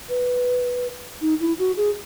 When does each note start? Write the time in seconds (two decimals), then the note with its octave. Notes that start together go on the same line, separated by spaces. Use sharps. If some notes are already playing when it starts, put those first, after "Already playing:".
0.09 B4
1.21 D#4
1.40 E4
1.59 F#4
1.77 G#4